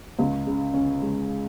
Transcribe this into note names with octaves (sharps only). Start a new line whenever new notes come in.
C#2
C#3
C#4
G#3